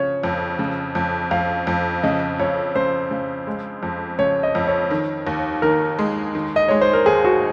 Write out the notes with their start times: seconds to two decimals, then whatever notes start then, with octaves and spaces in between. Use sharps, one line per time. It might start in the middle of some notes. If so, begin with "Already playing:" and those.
Already playing: C#3 F3 C#5
0.23 F2
0.59 C#3
0.95 F2
1.31 F2 F5
1.67 F2
2.03 C#3 D#5
2.39 F2 C#5
2.75 C#3 C5
3.11 C#3
3.47 G#3
3.83 F2
4.19 C#3 C#5
4.43 D#5
4.55 F2
4.67 C#5
4.91 D#3
5.27 D#2
5.62 D#3 A#4
5.99 G#3
6.35 D#3
6.56 D#5
6.69 G#3 C#5
6.81 C5
6.94 A#4
7.06 D#2 G#4
7.25 F#4